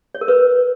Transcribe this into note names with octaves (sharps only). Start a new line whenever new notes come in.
C#5
A#4
B4